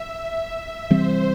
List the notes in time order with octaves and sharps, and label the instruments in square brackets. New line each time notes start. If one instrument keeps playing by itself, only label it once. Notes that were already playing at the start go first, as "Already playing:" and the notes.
Already playing: [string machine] E5
[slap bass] C3 E3 G3 C4 [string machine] C5